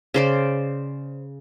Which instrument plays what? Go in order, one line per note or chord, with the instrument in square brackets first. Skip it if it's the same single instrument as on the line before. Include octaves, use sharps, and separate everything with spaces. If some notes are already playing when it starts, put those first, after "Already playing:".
[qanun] C#3 C5 D5